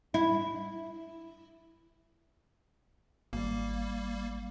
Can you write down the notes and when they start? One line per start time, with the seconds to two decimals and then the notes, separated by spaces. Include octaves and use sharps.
0.14 E4
3.33 G#1 G3 A#3